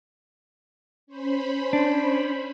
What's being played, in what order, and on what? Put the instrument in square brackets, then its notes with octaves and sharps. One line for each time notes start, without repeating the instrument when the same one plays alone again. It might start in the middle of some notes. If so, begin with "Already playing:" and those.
[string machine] C#4 C5 B5
[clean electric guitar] D4